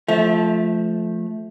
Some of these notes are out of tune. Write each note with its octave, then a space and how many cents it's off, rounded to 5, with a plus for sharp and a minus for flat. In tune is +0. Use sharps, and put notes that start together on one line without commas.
F3 +0 A3 -15 E5 -40